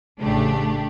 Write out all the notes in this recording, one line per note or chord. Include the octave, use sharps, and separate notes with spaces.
A1 C#3 A3 D4 G4